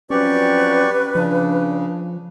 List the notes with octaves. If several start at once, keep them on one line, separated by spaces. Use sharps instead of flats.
F3 F#3 C4 C#4 G4 B4 D5 C#6
C#3 F3 D4